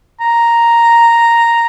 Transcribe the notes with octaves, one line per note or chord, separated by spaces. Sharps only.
A#5